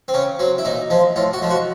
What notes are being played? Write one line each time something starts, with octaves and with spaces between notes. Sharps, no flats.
C4
C#3 C#4
F#3 C4
E4
A#2 D#4
F3 G#3
A2 F4
F#4
F3 G#3
F#4